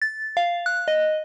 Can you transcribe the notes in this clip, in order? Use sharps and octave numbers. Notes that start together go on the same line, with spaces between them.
A6
F5
F#6
D#5